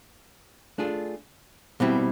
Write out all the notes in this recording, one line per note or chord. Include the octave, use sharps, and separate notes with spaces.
A3 D4 F4 G#4
B2 G3 C4 E4